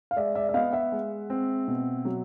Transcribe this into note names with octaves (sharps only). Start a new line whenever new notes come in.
F5
G#3 D5 E5
D5 E5
E5
B3 D#5 F5
E5 F#5
G#3
C4
B2
F#3